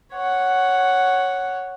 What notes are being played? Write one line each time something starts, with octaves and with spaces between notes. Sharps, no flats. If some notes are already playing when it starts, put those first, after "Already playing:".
C#5 F#5